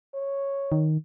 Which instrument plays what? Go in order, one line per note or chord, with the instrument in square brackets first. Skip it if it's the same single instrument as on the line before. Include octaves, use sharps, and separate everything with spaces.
[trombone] C#5
[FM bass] D#3